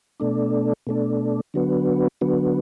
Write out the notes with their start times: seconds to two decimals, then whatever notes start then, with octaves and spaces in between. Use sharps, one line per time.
0.20 B2 A3 D4
0.87 B2 A3 D4
1.54 D3 F#3 B3
2.21 D3 F#3 B3